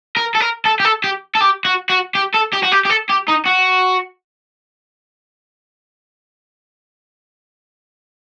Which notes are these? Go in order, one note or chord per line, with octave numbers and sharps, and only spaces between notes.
A#4
A4
A#4
A4
G4
A4
G4
A4
G4
F#4
F#4
G4
A4
G4
F#4
G4
G4
A4
G4
D#4
F#4